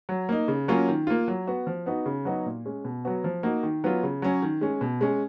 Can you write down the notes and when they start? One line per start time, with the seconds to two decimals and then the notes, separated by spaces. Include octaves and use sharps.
0.09 F#3
0.29 A#3 D#4
0.48 C#3
0.68 F#3 A#3 C#4 F4
0.88 D#3
1.07 A#3 F4
1.28 F#3
1.47 B3 F#4
1.67 F3
1.86 B3 D#4 F#4
2.06 C#3
2.25 F#3 B3 D#4 F#4
2.46 A#2
2.65 G#3 C#4
2.85 B2
3.05 F#3 B3 F#4
3.24 F3
3.43 A#3 D#4 F#4
3.63 D#3
3.84 F#3 B3 F4
4.03 C#3
4.22 F#3 C#4
4.42 D#3
4.61 G#3 C#4
4.81 B2
5.01 G#3 C#4